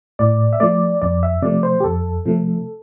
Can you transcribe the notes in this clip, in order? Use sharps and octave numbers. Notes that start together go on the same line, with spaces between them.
A2 D5
E5
F3 A3 D5
F2 D5
E5
C3 F3 A3 D5
C5
G4
F2 A4
C3 F3 A3